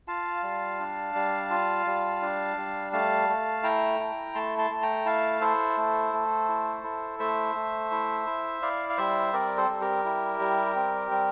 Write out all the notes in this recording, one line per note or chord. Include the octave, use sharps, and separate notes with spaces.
F4 F5 A5
G3
D4
G3
F4
G3
D4
G3
A3 F5 A5
A3
E4 G5 A#5
E4
A3 A5 C6
A5 C6
A3
G5 A#5
E4 F5 A5
E4 A4 C5
A3
A3
E4
E4
A3 C5 E5
A3
E4
E4
E4 D5 F5
F5
G3 C5 E5
C4 A#4 D5
A4 C5
G3
G4 A#4
E4
G3
C4
G3